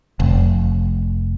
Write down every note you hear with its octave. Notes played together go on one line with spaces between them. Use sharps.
F1